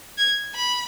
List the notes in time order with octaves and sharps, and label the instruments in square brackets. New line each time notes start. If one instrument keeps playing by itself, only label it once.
[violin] G#6
B5